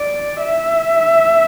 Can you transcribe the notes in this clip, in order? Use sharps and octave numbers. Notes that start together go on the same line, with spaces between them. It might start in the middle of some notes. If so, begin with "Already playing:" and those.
Already playing: D5
E5